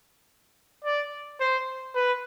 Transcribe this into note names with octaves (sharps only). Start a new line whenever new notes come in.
D5
C5
B4